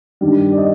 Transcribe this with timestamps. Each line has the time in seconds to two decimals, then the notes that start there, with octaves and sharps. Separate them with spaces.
0.21 G2 D#3 G3
0.52 D5
0.58 D#5